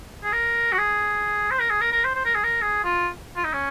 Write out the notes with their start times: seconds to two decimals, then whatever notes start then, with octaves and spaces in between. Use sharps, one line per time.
0.24 G#4
0.32 A#4
0.72 F#4
0.78 G#4
1.51 C5
1.60 A#4
1.70 G#4
1.81 A#4
1.92 A#4
2.04 C5
2.15 C5
2.25 A#4
2.34 G#4
2.44 A#4
2.61 G#4
2.84 F4
3.37 F4
3.44 D#4
3.53 C#4